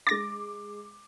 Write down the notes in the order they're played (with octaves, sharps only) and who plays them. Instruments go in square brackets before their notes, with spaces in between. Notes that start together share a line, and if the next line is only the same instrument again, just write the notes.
[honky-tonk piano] G#3 D6 [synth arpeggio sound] A6 A#6